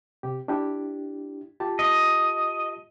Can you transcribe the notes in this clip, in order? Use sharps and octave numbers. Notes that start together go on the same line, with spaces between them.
C3 G4
D4 E4 G4
F4 G4 A5
D#5